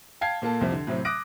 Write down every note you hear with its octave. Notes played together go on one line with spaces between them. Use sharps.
F5 G5 A5 G#6 C7
A#2 A#3 A4 A5
C2 F2 C3 F3
D3
A2 C3 F#3 C4
D6 D#6 F#6 A#6 D7